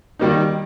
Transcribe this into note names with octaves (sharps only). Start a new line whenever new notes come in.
D#3 G3 A#3 D#4